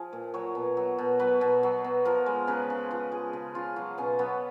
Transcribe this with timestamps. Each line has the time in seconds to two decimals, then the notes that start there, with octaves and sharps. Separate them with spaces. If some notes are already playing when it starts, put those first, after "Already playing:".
Already playing: F3 G#4 F5
0.13 A#2
0.34 F#3 C#5
0.55 B2
0.77 F#3
0.98 B2
1.19 F#3 B4
1.41 B2
1.63 F#3
1.84 B2
2.05 F3 A#4
2.26 G#3
2.47 C#3 B4
2.70 C#3
2.91 F3 B4
3.12 G#3 G#4
3.33 C#3
3.54 C#3 F4
3.76 F#3 F4
3.98 B2 C#4
4.19 F#3 B3